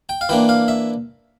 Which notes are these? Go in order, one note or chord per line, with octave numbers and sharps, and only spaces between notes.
G5
F5
E3 A#3 D4 G5
F5
E5